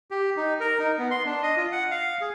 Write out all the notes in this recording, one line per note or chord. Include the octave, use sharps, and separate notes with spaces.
G4
D#4
A#4
D#4
B3
C6
D4
D#5
F4
F#5
F5
G#4